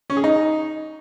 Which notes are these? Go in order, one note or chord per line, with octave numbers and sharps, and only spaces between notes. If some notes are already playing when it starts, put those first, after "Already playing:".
C#4
G#4
D#4